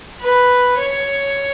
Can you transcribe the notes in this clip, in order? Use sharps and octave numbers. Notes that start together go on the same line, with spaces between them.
B4
C#5